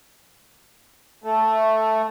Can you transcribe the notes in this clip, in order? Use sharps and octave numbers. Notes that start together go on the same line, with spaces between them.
A3